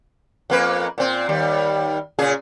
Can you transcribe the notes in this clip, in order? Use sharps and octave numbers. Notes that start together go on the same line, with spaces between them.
F2 A#3 B4
A#2 C4
D#2 G3
A#2 C#3 G#4